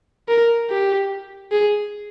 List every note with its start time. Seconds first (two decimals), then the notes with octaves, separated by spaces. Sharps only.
0.28 A#4
0.70 G4
1.52 G#4